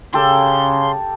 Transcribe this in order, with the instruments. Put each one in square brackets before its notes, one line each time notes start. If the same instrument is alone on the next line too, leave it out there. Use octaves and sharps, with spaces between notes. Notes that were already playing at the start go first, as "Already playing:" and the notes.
[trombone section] C#3 [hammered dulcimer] G4 A4 [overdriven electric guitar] C6